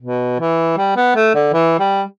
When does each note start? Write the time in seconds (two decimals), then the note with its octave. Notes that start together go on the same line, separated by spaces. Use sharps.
0.01 B2
0.39 E3
0.77 G3
0.96 B3
1.15 A3
1.35 D3
1.53 E3
1.80 G3